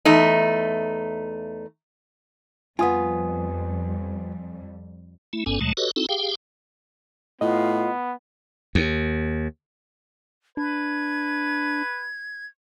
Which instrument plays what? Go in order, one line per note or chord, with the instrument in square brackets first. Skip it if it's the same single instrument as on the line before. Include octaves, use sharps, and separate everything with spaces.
[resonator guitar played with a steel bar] E2 A3 D#4
[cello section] F2 G3 [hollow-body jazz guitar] B3 F4 [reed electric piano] G#5 D#6
[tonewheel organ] A3 E4
G1 G2 B3 C#4 A4 G#5
D#2 B2 F#3 G#3 A3 A5
F#4 G4 A4 B4 C#5 D#5
C4 D#4 E4 F#4 A4
G4 G#4 F5 G5
[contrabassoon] A2 [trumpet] B3 [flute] F4 [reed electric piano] D#5
[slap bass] D#2
[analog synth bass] D4 [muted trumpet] B4 [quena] G#6